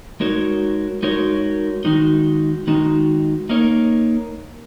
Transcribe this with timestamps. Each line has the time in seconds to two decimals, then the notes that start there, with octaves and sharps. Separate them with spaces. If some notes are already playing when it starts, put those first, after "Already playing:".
0.20 G#3 D#4 F#4 A#4 C#5
1.03 G#3 D#4 F#4 A#4 C#5
1.85 D#3 G#3 D#4 F#4
2.67 D#3 G#3 D#4 F#4
3.49 A#3 D#4 A#4 C#5